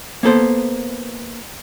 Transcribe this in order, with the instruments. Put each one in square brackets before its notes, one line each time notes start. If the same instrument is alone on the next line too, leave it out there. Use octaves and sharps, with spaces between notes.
[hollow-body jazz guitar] A#3 B3 A4 C5